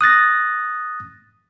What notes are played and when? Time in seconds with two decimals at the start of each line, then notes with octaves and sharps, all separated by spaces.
0.01 D#6 F#6 A6 A#6